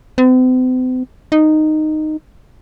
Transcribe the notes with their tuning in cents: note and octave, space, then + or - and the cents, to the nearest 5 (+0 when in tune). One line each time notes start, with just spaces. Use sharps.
C4 -45
D#4 -10